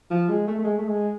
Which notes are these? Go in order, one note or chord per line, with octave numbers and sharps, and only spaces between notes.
F3
G#3
A3
A3
G#3
A3
G#3